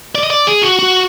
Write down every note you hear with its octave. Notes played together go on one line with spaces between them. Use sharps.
D5
D#5
D5
G#4
F#4
F#4